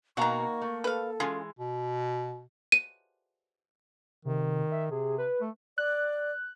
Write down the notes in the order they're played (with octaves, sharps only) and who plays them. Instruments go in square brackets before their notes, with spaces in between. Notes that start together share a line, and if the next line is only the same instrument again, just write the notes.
[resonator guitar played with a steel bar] B2 F5 A#5 [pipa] D#3 F#4 [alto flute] A#3 [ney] C#6
[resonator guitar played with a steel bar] A3
[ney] A4 [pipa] B4 F5
[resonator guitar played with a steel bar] E3 G#3 [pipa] C#4 F4 G#4
[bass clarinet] B2
[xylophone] D#7
[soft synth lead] C3 [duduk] D#3
[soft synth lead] E5
[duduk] C3 [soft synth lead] G#4
[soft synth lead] B4
[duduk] A3
[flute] D5 [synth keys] F#6